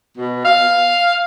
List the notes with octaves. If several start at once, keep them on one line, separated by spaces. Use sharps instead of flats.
B2
F5